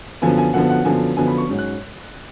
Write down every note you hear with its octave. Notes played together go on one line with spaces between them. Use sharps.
F#2 D3 F3 B3 G#5
G#5
F#2 D3 F3 B3 F#5
F#5
F#2 D3 F3 B3 G#5
F#2 D3 F3 B3 G#5
B5
C#6
G#2 F#3 C#4
F#6